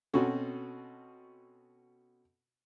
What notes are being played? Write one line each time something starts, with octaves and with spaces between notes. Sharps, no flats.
B2 C4 C#4 F#4 A4